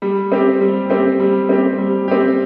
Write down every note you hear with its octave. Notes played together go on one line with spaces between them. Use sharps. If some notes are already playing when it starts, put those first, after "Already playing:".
G3
C4 G4
G3
C4 G4
G3
C4 G4
G3
C4 G4